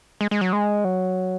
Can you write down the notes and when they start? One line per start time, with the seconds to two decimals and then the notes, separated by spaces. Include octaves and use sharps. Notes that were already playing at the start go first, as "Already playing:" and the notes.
0.21 G#3
0.31 G#3
0.41 F#3
0.53 G#3
0.84 F#3